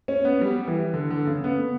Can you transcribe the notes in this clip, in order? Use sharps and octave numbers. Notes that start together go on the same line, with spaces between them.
C#4
B3
G3
E3
D3
D3
C#3
B3